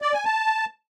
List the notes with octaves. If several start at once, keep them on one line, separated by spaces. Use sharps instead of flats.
D5
G#5
A5